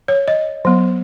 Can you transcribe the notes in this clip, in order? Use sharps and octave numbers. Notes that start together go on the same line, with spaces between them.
C#5
D#5
F#3 B3